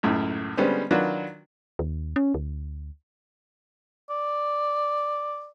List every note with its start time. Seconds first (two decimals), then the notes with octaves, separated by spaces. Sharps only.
0.03 C#2 F#2 A2
0.57 D3 G3 G#3 B3 C#4 C5
0.91 D#3 F#3 D4 F4 F#4 B4
1.79 D#2
2.16 C#4
2.34 D2
4.10 D5